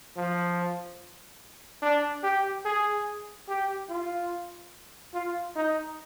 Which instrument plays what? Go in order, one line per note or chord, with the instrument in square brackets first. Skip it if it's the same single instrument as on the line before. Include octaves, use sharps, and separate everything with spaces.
[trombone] F3
D4
G4
G#4
G4
F4
F4
D#4